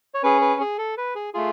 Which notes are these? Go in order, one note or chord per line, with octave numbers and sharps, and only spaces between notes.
C#5
C#4 G#4 B4
B4
G#4
A4
B4
G#4
A3 F4 G#4